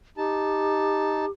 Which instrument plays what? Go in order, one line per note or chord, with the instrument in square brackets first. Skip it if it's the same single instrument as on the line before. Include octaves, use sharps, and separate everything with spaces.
[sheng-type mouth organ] D#4 A5 [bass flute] G4